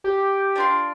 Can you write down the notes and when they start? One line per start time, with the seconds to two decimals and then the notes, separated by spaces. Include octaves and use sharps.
0.04 G4
0.56 D4 F4 C6